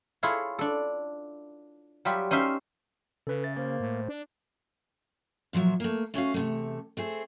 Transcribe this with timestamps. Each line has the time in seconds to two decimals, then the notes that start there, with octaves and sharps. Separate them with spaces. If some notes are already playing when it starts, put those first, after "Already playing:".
0.23 E4 F4 G#4 A4 C#5
0.59 D4 A4
2.05 F#3 G3 F4 G4 E5
2.31 C#4 D#4 C5 E5 F5 C6
3.27 C#3 A4 B4
3.44 E5 A6
3.56 A#3 C5
3.80 A2
4.09 D4
5.53 A#2 F3 F#3 E5
5.80 A3 A#3
6.14 A3 C#4 F#4 F5
6.34 E2 C3 A3
6.97 A3 C4 G#4